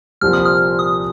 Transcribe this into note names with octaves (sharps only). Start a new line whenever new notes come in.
C2 A#2 F3 C4 F6
D#6
F6
D#6